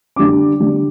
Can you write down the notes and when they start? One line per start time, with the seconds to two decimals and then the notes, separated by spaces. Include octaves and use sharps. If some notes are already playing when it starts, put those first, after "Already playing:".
0.16 D3 G3 D4 D6
0.60 D3 G3 D4